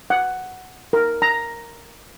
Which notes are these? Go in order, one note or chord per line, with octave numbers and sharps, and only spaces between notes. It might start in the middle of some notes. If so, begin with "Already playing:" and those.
F#5
A#4
A#5